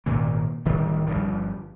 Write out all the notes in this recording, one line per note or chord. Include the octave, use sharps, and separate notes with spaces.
G#1 A#2 D#3 A#3
D1 D2 D#3 G3
G1 G2 F3 G3